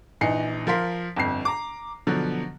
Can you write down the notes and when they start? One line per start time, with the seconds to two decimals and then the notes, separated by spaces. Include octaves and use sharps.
0.21 A#1 E3 D#4 C7 C#7
0.67 F3 A#4 F5 C6 B6
1.17 G1 F2 C7
1.45 A#5 D6
2.07 B2 D3 F3 F#3